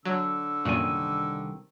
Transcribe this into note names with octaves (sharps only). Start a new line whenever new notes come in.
D3 F#3 E6
C2 F#2 A#2 D#3 G#5